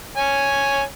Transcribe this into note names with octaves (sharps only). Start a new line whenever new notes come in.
C#5 G#5